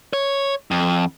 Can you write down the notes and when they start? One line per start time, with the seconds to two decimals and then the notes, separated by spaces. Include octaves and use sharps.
0.13 C#5
0.71 F2